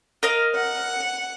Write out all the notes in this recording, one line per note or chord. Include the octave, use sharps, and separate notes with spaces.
A#4 D#5 F5
F#5